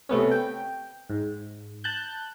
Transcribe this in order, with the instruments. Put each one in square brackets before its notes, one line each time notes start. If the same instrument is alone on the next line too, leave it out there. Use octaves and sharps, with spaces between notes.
[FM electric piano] C3 A3 B3 C#4
G5
G#2
A5 F#6 G6